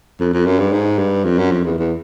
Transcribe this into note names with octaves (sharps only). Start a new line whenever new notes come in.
F2
F2
F#2
G2
G#2
G2
F2
F#2
F2
E2
E2